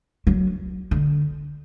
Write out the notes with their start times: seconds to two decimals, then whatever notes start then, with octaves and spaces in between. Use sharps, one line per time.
0.27 F#3
0.91 D3